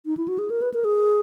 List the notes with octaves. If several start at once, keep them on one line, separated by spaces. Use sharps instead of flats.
D#4
E4
F#4
G#4
A#4
B4
A#4
G#4